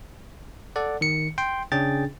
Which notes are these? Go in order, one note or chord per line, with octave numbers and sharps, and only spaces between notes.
A4 D5 F#5
D#3 C#7
G5 C6
C#3 C#4 D4 G#4 G5 A6